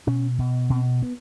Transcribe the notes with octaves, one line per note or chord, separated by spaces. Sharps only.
B2 C#4
B2
B2 C4
B3